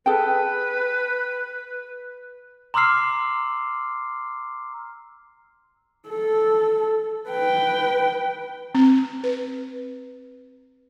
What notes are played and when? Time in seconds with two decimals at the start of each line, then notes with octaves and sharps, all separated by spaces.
0.06 G#4 A4 B4 G5
2.74 A#5 C6 D6 E6 F6 C7
6.09 A4
7.29 B4 G5
8.75 C4
9.24 B4